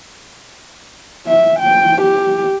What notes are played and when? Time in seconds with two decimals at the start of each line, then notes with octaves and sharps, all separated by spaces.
1.27 E5
1.60 G5
2.02 G4